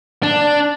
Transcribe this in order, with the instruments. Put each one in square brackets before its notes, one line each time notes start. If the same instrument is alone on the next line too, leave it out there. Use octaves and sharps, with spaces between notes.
[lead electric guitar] D4